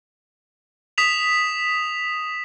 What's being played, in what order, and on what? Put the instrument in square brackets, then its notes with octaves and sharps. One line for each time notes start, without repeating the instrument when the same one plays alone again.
[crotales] D#6 B6 E7 F7